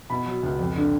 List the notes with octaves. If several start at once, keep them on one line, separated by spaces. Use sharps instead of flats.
B2 B5
F#3
C#2
F2
D3